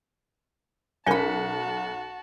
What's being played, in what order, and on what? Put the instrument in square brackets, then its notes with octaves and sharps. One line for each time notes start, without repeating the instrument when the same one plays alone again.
[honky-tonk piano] B1 C#7 [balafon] C#4 A#4 [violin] F#4 A5 [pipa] G#5 B5